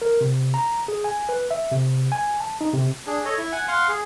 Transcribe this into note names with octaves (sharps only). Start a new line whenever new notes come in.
A#4
C3
A#5
G#4
G#5
B4
E5
C3
G#5
A5
D#4
C3
D4 G#4
A4 C#5 D#5
E4
F#5 G#5
F5 F#5 C6
G#4